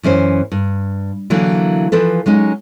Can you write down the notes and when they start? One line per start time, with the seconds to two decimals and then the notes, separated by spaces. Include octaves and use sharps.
0.03 F#2 E3 C#4 C5
0.52 G2
1.30 D3 E3 F#3 A#3
1.92 E3 F3 A4 B4
2.26 F#3 G#3 C#4 D#4